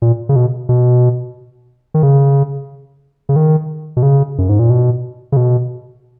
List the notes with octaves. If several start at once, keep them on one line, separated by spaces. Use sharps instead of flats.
A#2
C#3
B2
B2
D#3
C#3
C#3
D#3
B2
C#3
F#2
G#2
A#2
B2
C#3
B2